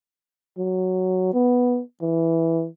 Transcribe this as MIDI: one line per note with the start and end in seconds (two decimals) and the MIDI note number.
0.58 1.30 54
1.34 1.80 59
2.02 2.67 52